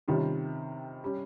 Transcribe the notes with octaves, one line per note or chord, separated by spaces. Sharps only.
C3 D#3 G3 C#4 F4
G3 C#4